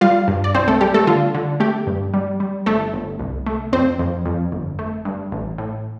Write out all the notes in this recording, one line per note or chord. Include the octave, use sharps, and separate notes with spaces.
G3 F4 F5
G2
D5
C2 C4 C5
A3 A4
G3 G4
A3 A4
D3 F4
D3
A3 G4
G2
G3
G3
G1 A3 A4
G1
C2
A3
F2 C4 C5
F2
F2
G1
A3
G2
A1
A2